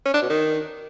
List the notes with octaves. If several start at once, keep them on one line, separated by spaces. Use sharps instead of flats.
C#4
D4
B2
D#3